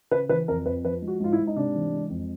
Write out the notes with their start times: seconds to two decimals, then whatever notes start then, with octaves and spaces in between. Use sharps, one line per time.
0.11 C#3 B4
0.29 E3 B4
0.48 F2 A#4
0.66 F2 B4
0.84 F3 B4
1.02 G#3
1.08 F#4
1.20 G#2 F4
1.33 E4
1.39 G#2
1.47 D#4
1.56 C3 D4
1.75 E3
1.92 G#3
2.10 F2